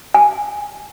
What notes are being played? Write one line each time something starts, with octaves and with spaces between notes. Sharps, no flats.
G#5